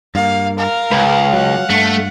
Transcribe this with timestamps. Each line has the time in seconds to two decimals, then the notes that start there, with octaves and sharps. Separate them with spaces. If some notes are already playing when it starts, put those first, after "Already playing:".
0.15 G2 A#3 F5
0.59 A#4 F5
0.92 C#2 B4
1.33 F#3 F#5
1.70 G2 A3